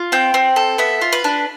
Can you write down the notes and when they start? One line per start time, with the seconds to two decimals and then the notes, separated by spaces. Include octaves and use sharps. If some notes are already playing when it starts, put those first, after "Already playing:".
Already playing: F4
0.12 C4 G5
0.34 C4
0.56 A4
0.78 B3 E5
1.02 F4
1.13 B4
1.24 D4